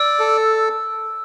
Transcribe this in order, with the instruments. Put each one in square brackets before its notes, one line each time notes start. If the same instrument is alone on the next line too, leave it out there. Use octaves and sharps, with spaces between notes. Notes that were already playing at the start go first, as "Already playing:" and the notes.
Already playing: [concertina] D5 [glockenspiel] E6
[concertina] A4